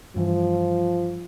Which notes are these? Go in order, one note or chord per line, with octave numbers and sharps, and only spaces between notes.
G2 E3 F3